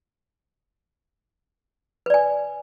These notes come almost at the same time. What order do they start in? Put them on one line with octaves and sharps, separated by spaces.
B4 D5 G#5